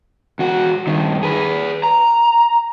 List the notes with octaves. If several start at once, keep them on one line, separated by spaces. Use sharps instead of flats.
E2 F#4
G2 D#3
G#4 B4
A#5